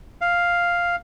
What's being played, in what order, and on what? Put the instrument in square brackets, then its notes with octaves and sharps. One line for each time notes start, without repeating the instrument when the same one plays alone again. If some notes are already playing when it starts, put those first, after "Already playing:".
[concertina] F5